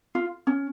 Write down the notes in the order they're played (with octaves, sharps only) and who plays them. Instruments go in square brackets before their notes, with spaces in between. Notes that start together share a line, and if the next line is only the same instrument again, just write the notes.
[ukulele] F4
C#4